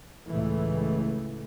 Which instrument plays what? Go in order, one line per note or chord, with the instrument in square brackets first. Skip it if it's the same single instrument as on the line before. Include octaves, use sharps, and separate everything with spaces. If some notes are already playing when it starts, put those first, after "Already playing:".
[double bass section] C#2 A2 E3 A3